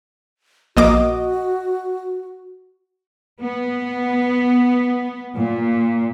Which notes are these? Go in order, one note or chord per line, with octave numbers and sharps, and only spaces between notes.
A#1 A#3 F#4 D#5 D6
B3
A#2